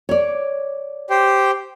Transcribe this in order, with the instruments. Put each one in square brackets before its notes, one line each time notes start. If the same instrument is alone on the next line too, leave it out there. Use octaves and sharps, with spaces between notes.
[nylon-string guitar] C#5 D5
[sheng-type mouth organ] G4 C5 G5